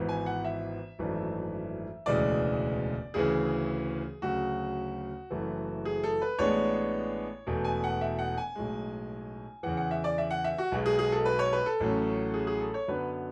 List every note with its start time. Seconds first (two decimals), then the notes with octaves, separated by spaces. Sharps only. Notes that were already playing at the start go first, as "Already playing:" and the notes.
Already playing: G#1 G#2 E3 B3
0.09 G#5
0.26 F#5
0.44 E5
0.99 G#1 F#2 E3 A3 D4
2.06 E1 D2 C#3 E3 G#3 D5
3.14 D2 C#3 E3 G#4
4.22 D2 C#3 F#3 F#4
5.30 F#1 F#2 E3 A3
5.85 G#4
6.03 A4
6.21 B4
6.39 A1 A2 G#3 B3 D4 C#5
7.47 E1 E2 B2 A3
7.64 G#5
7.84 F#5
8.01 E5
8.19 F#5
8.38 G#5
8.55 B1 A2 G#3
9.63 E2 C#3 E3 F#5
9.77 F#5
9.91 E5
10.04 D5
10.18 E5
10.31 F#5
10.44 E5
10.58 F#4
10.72 B1 B2 G#3
10.86 G#4
10.99 G#4
11.12 A4
11.25 B4
11.39 C#5
11.53 B4
11.66 A4
11.80 A1 A2 F#3 C#4
12.34 G#4
12.47 G#4
12.60 A4
12.74 C#5
12.88 F#2 D3 F#3 B3 B4